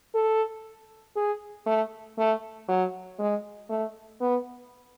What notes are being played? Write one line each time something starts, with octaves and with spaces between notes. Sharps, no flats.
A4
G#4
A3
A3
F#3
G#3
A3
B3